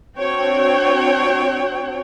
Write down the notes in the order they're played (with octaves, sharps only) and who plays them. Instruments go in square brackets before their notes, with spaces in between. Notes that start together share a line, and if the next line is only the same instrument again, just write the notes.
[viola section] C4 D4 F#4 C#5 G5